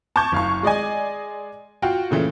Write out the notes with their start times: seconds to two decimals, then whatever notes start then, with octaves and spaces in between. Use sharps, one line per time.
0.16 A5 C#6 D6 G6 G#6
0.32 F#1 F5 C#6
0.63 G#3 D5 D#5 G#5
1.82 F4 F#4 G5
2.11 A#2 C#3 E3 A3